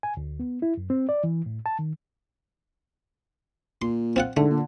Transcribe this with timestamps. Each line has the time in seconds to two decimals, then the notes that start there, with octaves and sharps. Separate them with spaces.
0.03 G#5
0.17 D2
0.40 B3
0.62 E4
0.77 F#2
0.90 C4
1.09 D5
1.24 E3
1.46 A2
1.66 A5
1.79 D#3
3.82 A#2 C6
4.16 C4 F4 F#5
4.37 G#2 D3 A3
4.50 A#2